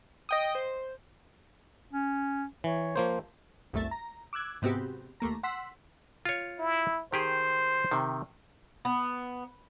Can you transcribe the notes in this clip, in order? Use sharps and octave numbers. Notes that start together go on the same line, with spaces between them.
D#5 G5 D#6
C5
C#4
E3 C#5
F3 A#3 C5
G1 C2 F#2 A3 E5 A6
A#5
D6 E6 F#6 G#6
G#2 C3 B3 C4 F#4 G4
D#2 A3 A#3 A#5
F#5 C6 E6 B6
F4 C#5
E4
D#3 G4 G#4 C5
C3 D#3
B3